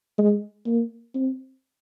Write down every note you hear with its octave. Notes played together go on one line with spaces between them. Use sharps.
G#3
A#3
C4